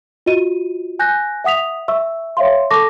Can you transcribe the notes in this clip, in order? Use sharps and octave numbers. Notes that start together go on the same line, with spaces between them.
F4 F#4 D#5 D#7
G#5 F#6 G6 A#6
E5 F#5 D#6 B6 F7
E5 C#6 E6
C#5 E5 F5 C6
A4 A5 C#6 D6 A#6